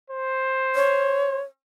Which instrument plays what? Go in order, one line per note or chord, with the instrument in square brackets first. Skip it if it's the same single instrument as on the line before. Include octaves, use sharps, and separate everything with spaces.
[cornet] C5
[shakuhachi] C#5